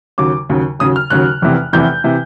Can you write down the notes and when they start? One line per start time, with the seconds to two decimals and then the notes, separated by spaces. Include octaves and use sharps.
0.18 D#2 C#3 F#3 D6
0.50 D#2 C#3 F#3
0.79 D#2 C#3 F#3 D#6
0.96 F6
1.10 D#2 C#3 F#3 F#6
1.42 F1 E2 C3 E3
1.73 F1 E2 C3 E3 G6
2.04 C3 E3